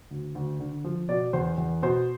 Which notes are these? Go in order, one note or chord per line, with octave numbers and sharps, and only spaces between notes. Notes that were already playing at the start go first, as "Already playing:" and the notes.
D2
D2
D3
F3
B2 D5
E2 C5
E2
B2 C5